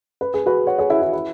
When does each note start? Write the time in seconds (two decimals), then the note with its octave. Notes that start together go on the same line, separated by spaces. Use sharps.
0.21 B4
0.34 G#4
0.46 F#4 B4
0.67 C#5 F#5
0.79 G#4 C#5
0.90 E4 G#4
1.02 E4
1.13 E4